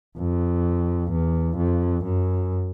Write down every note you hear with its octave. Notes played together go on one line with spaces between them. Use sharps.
F2
E2
F2
F#2